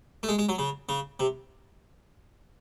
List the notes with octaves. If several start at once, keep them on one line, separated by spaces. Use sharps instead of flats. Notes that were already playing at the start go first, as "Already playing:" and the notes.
A3
G#3
G#3
F#3
C#3
C#3
C3